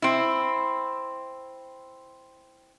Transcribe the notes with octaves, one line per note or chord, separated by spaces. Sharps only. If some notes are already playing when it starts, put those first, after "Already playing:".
C4 E4